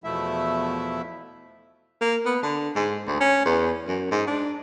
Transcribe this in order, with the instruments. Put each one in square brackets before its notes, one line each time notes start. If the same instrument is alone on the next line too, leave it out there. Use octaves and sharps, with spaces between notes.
[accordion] E2 B2 F3 A3 E4 E5
[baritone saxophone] A#3
B3
D3
G#2
D2
C#4
E2
F#2
G#2
D4